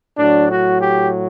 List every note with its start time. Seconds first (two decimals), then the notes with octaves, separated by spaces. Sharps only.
0.17 A2 F#3 D4
0.49 F#4
0.79 G4